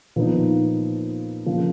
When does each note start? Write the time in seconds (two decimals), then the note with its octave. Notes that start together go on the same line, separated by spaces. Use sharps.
0.16 A#2 F3 B3 D#4
1.46 C#3 F3 A#3